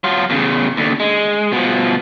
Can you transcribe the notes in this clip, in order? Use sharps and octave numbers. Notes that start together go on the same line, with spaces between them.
F#3 F4
E2 C#3
D#2 D3
G#3
B2 F3